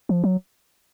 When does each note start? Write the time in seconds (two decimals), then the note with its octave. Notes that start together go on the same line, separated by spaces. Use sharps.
0.09 F3
0.24 F#3